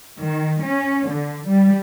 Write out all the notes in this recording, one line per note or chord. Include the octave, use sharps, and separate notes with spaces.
D#3
C#4
D3
G3